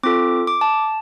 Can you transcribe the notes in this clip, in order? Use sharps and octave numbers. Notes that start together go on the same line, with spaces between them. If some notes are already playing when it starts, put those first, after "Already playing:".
C4 F4 A4 D6
D6
A5